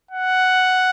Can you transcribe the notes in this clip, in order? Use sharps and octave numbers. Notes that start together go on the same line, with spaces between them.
F#5